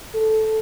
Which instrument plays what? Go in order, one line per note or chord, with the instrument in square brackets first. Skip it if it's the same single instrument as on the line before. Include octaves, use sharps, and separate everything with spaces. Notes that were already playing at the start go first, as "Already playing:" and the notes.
[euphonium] A4